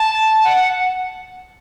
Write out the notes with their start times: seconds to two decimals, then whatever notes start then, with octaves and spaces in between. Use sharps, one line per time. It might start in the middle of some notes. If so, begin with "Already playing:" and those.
Already playing: A5
0.44 F#5